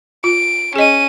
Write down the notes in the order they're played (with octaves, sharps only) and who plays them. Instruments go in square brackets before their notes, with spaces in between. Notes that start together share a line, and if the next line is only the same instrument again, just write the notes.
[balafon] F4 [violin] D7
[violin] C#4 D#7 [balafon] G#4 D#5